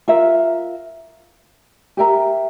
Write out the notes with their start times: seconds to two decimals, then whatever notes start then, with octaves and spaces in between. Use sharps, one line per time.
0.08 F4 A#4 E5
1.97 G4 A#4 E5 A#5